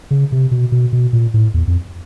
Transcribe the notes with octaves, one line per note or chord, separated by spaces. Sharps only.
C#3
C3
B2
B2
B2
A#2
A2
E2
F2